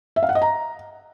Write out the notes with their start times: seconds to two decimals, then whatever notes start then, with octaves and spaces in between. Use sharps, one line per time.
0.16 E5
0.23 F5
0.29 F#5
0.35 D#5
0.42 A#5